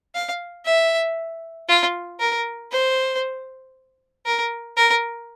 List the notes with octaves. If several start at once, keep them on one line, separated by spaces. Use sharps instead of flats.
F5
E5
F4
A#4
C5
A#4
A#4